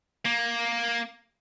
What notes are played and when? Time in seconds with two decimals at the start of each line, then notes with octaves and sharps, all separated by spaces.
0.25 A#3